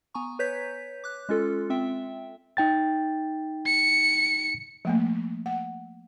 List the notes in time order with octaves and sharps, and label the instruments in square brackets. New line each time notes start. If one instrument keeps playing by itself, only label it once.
[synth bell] B3 G#5 A#5 C#6
B4 C#5 G6 B6
D6 F#6
G#3 C#4 F4 A4
C4 E5 G5
[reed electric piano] D#4 G5 A6
[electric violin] C#7
[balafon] F3 A3 A#3
F#5